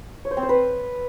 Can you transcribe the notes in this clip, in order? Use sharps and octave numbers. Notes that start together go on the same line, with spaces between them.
C#5
C5
C4
C5
B4